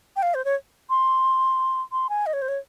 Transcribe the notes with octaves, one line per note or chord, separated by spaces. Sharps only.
G5
F5
C5
C#5
C6
C6
G#5
D#5
C#5
C5
C#5